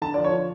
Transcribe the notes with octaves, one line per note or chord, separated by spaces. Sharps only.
D3 A5
F3 D5
C#5
D3